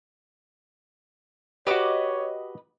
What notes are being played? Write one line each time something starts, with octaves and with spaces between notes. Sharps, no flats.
F#4 G4 B4 C#5 D#5 D6